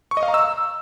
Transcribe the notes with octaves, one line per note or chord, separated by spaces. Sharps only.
C#6
D#5
F5
A#5
E6